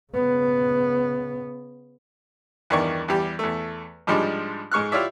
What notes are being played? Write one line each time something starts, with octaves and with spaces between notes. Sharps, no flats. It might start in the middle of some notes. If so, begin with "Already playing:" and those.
C#3 B3
E2 G2 D#3 D5 C#6
E2 G3 G4
E2 A3
G#2 F3 G3 G#3 D4
G#2 G#3 C#6 F6 F#6
E4 F4 G4 C#5 D5 E5